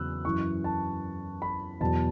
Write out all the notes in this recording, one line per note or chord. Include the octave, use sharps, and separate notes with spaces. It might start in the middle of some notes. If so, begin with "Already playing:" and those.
Already playing: E2 C#3 F#3 B5 E6 F#6
F#2 E3 C#6
A5
B5
E2 B2 F#3 A5